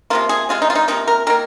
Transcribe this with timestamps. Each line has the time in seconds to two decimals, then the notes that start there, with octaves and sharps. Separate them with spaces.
0.10 C3 F3 A#3 F4
0.29 G#4
0.49 C3 G#3 F4
0.62 D#4
0.70 F4
0.75 D#4
0.88 C3 F3 A#3 D#4
1.07 A#4
1.27 D#3 A#3 A#4